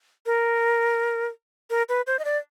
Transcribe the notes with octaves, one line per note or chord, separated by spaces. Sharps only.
A#4
A#4
B4
C5
D#5
D5